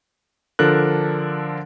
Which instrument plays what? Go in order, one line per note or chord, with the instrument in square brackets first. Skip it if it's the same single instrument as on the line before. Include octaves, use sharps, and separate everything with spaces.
[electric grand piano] D3 F3 D4 A4 A#4 F#6